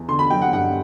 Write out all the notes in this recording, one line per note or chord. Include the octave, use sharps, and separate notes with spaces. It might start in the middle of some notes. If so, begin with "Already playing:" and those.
Already playing: E2
D3 C6
B5
F#3 G5
F#5
G2 F#5